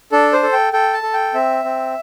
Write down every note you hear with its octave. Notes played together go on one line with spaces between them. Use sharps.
D4 A4
C5
A4
G5
A4 G5
A5
A4
G5
C4 E5
C4